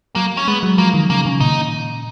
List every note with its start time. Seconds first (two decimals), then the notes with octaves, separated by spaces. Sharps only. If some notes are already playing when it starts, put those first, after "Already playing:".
0.15 F#3 A#3
0.37 C#4
0.48 G#3 B3
0.63 F#3
0.78 F3 A#3
0.94 D#3
1.10 C#3 A#3
1.26 C#3
1.40 A#2 D#4